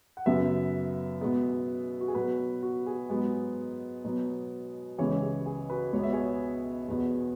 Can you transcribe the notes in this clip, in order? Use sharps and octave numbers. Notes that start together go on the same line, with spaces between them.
F#5
F#2 C#3 F#3 B3 B4 E5
B2 G#3 B3
F#4
G#4
B2 F#3 B3 F#4 B4
F#4
G#4
G#2 F#3 B3 G#4
B2 F#3 B3
C#2 C#3 E3 G#4 C#5
G#4
G#4
F#4 B4
C#2 B2 B3 C#5
E5
G#4 C#5
E2 B2 B3